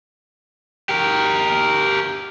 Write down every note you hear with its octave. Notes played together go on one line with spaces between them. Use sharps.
G4 A#4